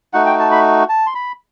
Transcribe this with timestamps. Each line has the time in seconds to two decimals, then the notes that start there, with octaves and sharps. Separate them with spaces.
0.13 A3 D#4 F#4 F#5
0.26 G5
0.39 A5
0.52 B5
0.89 A5
1.06 C6
1.15 B5